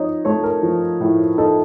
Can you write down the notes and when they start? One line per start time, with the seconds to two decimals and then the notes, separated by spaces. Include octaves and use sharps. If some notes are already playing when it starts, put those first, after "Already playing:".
Already playing: F3 D#4 C#5
0.25 A3 C#5
0.43 A#4
0.63 F3
1.01 A2
1.38 D#4 A4